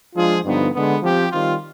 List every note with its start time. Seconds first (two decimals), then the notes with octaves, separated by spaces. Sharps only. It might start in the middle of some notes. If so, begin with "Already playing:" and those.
0.15 F3 G#3 D4 F4 G#4
0.44 G2 D3 F3 B3 D#4
0.74 D3 G#3 B3
1.03 F3 C4 G4
1.32 D#3 G3 C4 F4